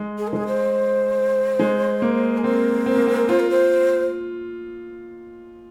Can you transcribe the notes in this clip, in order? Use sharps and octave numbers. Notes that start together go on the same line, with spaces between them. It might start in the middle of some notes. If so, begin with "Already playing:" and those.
Already playing: G#3
G#4
A#4
G#3 G#4
C5
G#3
A#3
G#4
C4 A#4
C4
A#3
C4
F4 C5
A#4
C5